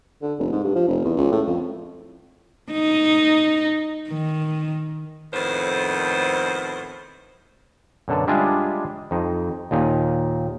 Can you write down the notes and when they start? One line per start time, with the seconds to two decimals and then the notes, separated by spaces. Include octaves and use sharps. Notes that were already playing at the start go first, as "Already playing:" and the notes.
0.23 D3
0.39 F1
0.52 G#2
0.64 G2
0.76 F3
0.88 F1
1.05 E2
1.17 C#2
1.32 A2
1.47 F2
2.71 D#4
4.09 D#3
5.33 F2 A2 D#3 B3 C5
8.08 F#2 B2 D3 A4
8.28 G3 G#3 D4 F4 G#4 E5
9.11 F2 D#4
9.71 D#2 A#2 D#4